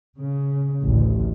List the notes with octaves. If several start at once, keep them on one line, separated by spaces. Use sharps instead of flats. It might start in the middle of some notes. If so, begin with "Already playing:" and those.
C#3
A1 D2